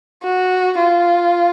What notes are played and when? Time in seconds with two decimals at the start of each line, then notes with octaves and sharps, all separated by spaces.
0.23 F#4
0.78 F4